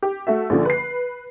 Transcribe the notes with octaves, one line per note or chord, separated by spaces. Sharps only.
G4
A3 F#4 E5
A#1 D3 F3
B4 C7